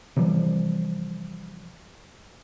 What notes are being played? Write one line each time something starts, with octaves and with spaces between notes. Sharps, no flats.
C3 E3 F3 G3